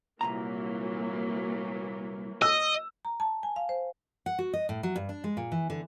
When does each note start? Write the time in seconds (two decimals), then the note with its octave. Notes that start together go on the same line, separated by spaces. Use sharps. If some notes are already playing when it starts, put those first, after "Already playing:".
0.21 C2 A#2 E3 F#3 A#3 A#5
2.42 D#5 E6
3.05 A#5
3.20 A5
3.43 G#5
3.56 F5
3.69 C5
4.26 F#5
4.39 F#4
4.53 D#5
4.69 A2
4.83 F#3
4.96 G2
5.09 D4
5.24 G#3
5.37 A#2
5.52 E3
5.70 D3